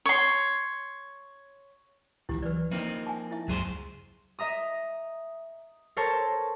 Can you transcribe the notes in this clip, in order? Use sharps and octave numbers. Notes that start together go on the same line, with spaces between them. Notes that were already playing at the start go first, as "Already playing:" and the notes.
C#5 C6
C#2 D#3 F3 E4 G4
E3 F#3 B4 D5
F3 A#3 C4 D#4
G#5 A5
E4 E5
C#2 F#2 C#3 F#3 G#4 C5
D#5 E5 A#5 D#6
A4 A#4 C5 C#5 A5